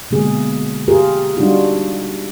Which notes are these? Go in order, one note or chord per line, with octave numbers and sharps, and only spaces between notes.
B2 D3 G#3 A#3 G#4
F4 G4 G#4 A#4
G3 D4 D#4 F4 F#4